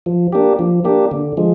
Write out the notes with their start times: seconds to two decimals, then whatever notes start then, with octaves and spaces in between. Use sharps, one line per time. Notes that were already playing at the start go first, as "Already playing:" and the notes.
0.06 F3
0.33 A#3 D4 G4
0.59 F3
0.84 A#3 D4 G4
1.11 D3
1.37 F3 G#3